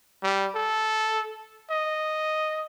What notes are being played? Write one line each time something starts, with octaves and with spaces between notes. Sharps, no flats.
G3
A4
D#5